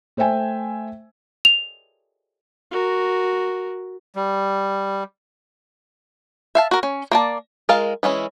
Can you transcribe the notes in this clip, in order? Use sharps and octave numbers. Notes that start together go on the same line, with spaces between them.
A3 C5 E5 G5 G#5
F7
F#4 A#4
G3
E5 F5 A5
F#4 A#4
C#4
A#3 D5 A5
G#3 F4 A#4 F5
E3 G#3 C#4 E4